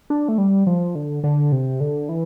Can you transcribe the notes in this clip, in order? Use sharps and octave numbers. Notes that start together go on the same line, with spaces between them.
D4
A3
G3
F3
D3
D3
C3
D3
E3